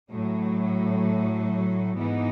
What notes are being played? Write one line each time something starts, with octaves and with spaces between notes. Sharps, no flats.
A2 F#3 A3
G#2 E3 B3 D#4